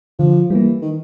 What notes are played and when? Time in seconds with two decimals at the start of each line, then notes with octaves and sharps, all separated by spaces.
0.19 D3 F3
0.50 E3 G3 A#3
0.82 D#3